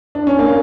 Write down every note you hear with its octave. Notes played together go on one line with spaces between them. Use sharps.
D4
C#4
A#3